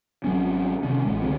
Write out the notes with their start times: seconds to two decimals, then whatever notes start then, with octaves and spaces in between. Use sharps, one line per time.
0.24 G#1 F#3 C4 C#4
0.83 C3 D#3 C#4
1.05 A1 A2 G#3
1.22 C#2 D3 G#3 C4